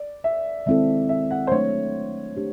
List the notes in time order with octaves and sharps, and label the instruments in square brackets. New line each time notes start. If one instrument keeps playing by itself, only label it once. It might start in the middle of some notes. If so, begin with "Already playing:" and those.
Already playing: [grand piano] D5
E5
[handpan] D#3 G#3 C4 E4 A4 [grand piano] E5
[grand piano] E5
F#5
C5
[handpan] F#3 A3 D4 [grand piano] C#5
[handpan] A3 D4 G4